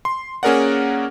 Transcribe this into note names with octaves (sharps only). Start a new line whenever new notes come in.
C6
A#3 C#4 G#4 A#4 D5 F#5